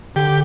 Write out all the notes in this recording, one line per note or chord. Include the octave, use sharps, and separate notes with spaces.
D3 G4